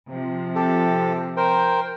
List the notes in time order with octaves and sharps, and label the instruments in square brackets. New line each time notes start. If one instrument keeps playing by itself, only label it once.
[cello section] C3 F3
[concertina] G4 A4
A#4 C5 G5